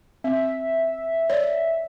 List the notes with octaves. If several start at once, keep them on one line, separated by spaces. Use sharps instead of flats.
C4 E5
C#5 D5